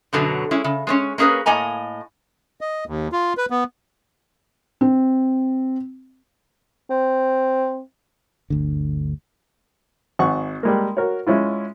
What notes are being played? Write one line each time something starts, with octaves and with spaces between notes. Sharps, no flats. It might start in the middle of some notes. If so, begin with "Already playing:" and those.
F#2 B2 D3 F#3
G#3 C#4 E4
C#3
G#3 C4 C#4
A#3 C#4 G#4 A#4 B4
A2 A#3 D#5 G#5 A#5
D#5
D#2
F4
B4
B3
C4
C4
G1 D2 D3
G#1 F#5 C#6
G3 G#3 A#3
F#4 A#4 C#5
G#3 C#4 E4 F4